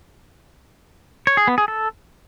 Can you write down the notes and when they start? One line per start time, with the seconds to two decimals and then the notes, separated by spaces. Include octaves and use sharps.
1.27 C#5
1.37 G#4
1.48 B3
1.58 G#4
1.68 A4